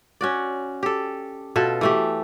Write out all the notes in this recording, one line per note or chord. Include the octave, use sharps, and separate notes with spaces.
C#4 F#4 D5
G4 A4
B2 F4 A4 E5
E3 A3 G4